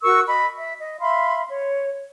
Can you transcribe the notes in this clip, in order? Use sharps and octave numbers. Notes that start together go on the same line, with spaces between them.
F#4 A#4 C#6 E6
D#5 B5
E5
D#5
E5 F5 B5 C6
C#5